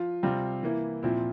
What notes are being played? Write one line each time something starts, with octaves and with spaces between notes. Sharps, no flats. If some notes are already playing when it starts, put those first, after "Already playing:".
Already playing: F3 F4
C3 G3 C4 F4
E3 A#3 E4
A#2 F3 C4 E4